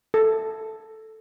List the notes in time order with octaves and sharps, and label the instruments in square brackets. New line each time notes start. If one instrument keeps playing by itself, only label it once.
[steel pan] A4